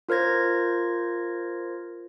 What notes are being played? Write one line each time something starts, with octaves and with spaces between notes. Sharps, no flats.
F4 A#4 C5 G#6 A#6